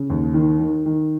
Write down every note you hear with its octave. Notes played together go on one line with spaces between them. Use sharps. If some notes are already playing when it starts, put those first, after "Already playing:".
Already playing: C#3
D#2
D#3
D#3
D#3